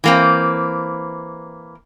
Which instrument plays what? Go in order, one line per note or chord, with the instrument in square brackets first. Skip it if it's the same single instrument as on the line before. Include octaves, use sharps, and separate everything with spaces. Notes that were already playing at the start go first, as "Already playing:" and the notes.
[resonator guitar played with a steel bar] E3 A#3 C4